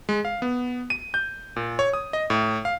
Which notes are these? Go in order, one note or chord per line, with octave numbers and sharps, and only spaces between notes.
G#3
F5
B3
D#7
G6
A#2
C#5
D#6
D#5
A2
F5